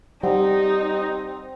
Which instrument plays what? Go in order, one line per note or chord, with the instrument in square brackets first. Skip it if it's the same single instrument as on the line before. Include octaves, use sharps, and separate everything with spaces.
[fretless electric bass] G3 [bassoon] C4 [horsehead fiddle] D#4 [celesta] F#5